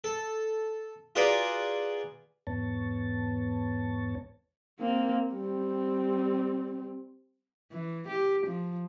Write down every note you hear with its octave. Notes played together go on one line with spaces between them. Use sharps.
A4
F4 F#4 G#4 B4 D5 A#5
E2 G#2 B3 C#5 A5
A#3 C4
G3 C4
E3
G4
F3